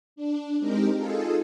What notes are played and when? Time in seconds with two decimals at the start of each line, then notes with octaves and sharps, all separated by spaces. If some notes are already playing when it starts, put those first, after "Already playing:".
0.16 D4
0.59 G#3 C4 D#4 G4 A#4
0.96 D#4 F4 G#4 A4